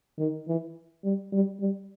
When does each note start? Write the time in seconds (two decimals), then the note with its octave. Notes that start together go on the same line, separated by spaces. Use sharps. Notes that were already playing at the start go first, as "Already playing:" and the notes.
0.19 D#3
0.48 E3
1.04 G3
1.33 G3
1.60 G3